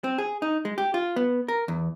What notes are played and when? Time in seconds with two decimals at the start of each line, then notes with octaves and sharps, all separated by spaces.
0.04 C4
0.18 G#4
0.42 D#4
0.65 G#3
0.78 G4
0.94 F4
1.16 B3
1.48 A#4
1.68 E2